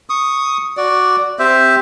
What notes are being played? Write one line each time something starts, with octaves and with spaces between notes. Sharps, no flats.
C#6 D#6
F#4 D5
C4 G4 C5 E5